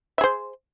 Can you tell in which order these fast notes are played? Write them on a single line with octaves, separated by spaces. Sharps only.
E5 G#4 C5